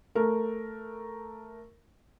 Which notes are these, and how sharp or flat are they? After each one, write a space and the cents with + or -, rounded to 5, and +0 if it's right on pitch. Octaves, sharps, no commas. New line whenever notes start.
A3 +5 A#4 +0